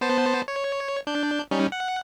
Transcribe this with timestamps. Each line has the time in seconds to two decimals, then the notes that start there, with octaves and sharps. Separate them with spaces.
0.01 B3 C5 A5
0.48 C#5
1.07 D4 G6
1.51 G3 C#4 D#4
1.72 F#5